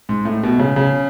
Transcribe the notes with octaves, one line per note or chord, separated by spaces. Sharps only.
G#2
A2
B2
C#3
C#3